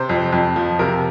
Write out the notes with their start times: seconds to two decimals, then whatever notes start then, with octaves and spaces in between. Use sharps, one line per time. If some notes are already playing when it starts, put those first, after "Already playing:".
Already playing: C3 C5
0.09 F2
0.32 F2
0.56 F3
0.79 C3 A#4